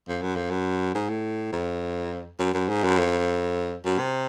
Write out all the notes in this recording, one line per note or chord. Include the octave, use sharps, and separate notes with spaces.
F2
F#2
F2
F#2
G#2
A2
F2
F#2
F#2
G#2
F#2
F2
F#2
C3